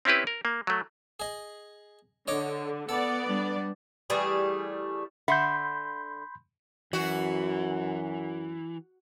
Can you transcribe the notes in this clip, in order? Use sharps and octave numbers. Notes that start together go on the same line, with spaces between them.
C4 C#4 E4 G4 B4
A#4
A#3
F#3 A3
G#4 D#5
D3 C#5 D#5 D6
B3 A4 D5 F#5
G3 D4
E3 G3 A3 G#4
D3 E5 F#5 B5 C6 G6
F#2 E3 F#4